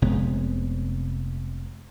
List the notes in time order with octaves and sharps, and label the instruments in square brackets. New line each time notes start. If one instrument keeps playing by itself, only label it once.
[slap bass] F1 C3 G#3 B3